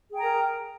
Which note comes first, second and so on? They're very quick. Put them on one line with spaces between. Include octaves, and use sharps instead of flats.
G#4 G5 A#5 A#4